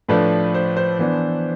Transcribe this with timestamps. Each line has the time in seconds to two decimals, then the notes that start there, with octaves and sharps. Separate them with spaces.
0.09 A2 F3 A3 D4 B4
0.54 C5
0.77 C5
0.99 E3 B3 D4